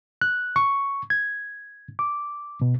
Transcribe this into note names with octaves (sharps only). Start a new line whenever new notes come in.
F#6
C#6
G#6
D6
B2